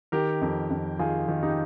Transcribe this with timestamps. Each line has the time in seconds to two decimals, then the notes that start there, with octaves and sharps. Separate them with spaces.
0.12 D#3 G4 A#4
0.42 F2
0.70 F2
0.99 D#3 F4 G#4
1.28 D#3
1.43 D#4 G4